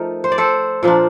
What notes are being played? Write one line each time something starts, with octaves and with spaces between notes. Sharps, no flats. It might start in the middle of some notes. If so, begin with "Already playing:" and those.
Already playing: F3 A3 D#4 A#4
C5
D5
A4 C5
A#2 F3 A#3 D4